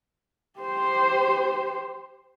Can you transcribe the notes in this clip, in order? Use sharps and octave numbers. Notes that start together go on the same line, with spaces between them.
G4 C5